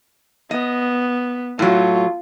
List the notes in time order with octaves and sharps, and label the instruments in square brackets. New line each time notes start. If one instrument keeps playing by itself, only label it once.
[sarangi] B3 [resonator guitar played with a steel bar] D#5
[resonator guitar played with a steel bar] A2 F#3 [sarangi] F4